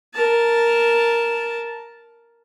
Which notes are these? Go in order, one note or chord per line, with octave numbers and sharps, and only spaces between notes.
A#4 A5